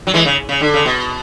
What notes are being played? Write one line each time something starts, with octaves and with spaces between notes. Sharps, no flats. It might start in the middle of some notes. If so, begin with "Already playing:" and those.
F#3
E3 G#3
C#3
C#3
D3
C#3
B2